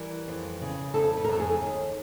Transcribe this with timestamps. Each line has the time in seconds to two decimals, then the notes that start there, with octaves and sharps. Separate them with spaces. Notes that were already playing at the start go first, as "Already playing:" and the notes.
Already playing: E3 G3 A#4
0.28 F2
0.61 C#3
0.94 F2 A4
1.17 B4
1.25 A#4
1.28 F2 A4
1.40 G#4
1.61 D#2